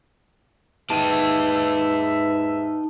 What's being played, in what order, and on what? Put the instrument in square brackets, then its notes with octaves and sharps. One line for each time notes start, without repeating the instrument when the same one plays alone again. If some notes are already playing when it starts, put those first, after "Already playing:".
[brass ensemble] G#2 B4 E5 [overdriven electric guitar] D#4 G4 [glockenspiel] A5 D#7